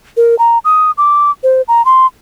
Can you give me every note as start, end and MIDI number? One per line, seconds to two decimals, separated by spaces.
0.17 0.38 70
0.39 0.58 82
0.65 0.91 87
0.98 1.31 86
1.43 1.62 72
1.68 1.85 82
1.85 2.06 84